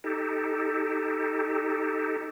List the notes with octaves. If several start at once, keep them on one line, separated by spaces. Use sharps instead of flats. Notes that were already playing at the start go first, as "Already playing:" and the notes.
D#4 G4 A4